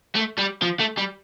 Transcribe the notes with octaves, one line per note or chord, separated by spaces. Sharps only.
A3
G3
F3
A3
G3